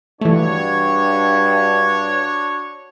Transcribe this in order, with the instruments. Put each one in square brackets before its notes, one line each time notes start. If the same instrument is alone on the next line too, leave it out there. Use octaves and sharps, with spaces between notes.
[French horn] G2 [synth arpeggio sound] E3 A3 [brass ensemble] D4 F#4 C#5